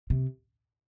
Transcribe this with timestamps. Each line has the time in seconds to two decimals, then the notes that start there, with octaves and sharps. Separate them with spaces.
0.10 C3